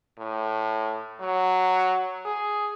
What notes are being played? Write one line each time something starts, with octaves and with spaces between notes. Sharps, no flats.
A2
F#3
G#4